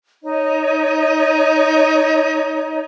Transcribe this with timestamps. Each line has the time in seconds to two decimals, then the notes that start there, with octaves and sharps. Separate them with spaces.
0.24 D#4 C#5 D#5